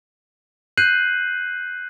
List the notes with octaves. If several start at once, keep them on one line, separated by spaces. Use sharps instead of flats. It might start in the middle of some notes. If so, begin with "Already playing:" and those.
F#6 G6 C7 D#7 F#7